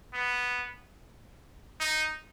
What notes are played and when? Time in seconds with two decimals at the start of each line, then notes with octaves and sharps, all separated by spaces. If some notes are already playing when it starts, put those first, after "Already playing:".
0.14 B3
1.80 D#4